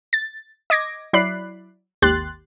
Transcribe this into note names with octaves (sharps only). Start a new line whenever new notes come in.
A6
D#5 D6 G#6 A#6
F#3 E4 D5 B5 F#6 C7
G#1 D#2 G4 C6 F#6 A6